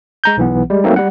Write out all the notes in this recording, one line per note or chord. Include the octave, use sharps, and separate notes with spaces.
G#3 A#5 G6
B1 E3 B3
G3 G#3
F#3 A3 A#3 C4 D#4
G3 F#5